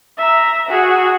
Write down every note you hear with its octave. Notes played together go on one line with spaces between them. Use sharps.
E5 A#5
F#4 G#4